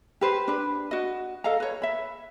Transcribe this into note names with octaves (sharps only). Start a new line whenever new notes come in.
G4 B4 C5
D4 B4
F#4 D#5
A4 D#5 F5 A#5
B4 C#5
E5 B5